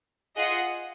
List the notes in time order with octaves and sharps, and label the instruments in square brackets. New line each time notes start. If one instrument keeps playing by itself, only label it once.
[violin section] F4 G#4 D#5 F#5